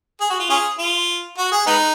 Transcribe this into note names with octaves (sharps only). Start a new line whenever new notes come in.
G#4
F#4
F4
C#4 F4 G#4
F4
F#4
G#4
G#3 B3 D#4